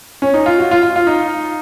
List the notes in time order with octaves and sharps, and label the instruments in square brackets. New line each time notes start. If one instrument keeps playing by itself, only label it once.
[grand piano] C#4
D#4
F4
F#4
F4
F4
F4
D#4